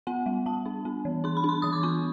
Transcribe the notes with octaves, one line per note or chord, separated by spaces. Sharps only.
B3 F#5
G3
G3 A5
D4
B3
E3
D4 C6
B5
D4 C6
E3 D#6
D6
B3 C#6